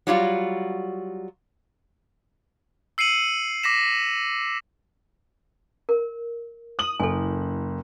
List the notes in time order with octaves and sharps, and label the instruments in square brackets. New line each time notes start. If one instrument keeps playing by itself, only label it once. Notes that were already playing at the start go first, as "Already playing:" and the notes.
[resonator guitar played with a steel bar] F#3 G3 F4 F#4
[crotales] E6 C7 C#7 D#7 F#7
D6 A#6 B6 E7
[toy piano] A#4
[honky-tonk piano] D#6 F#7
[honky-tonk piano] F#1 [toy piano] A4 G#5